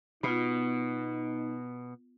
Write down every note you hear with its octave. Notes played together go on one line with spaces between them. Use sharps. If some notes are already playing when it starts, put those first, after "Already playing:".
B2 B3 D#4 F4